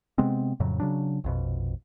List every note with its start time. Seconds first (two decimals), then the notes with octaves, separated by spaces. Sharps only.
0.18 C3 G#3 B3 C4
0.60 F2 A2 C#3 F#3
0.80 C#3 F#3 D4
1.24 A#1 F2 B2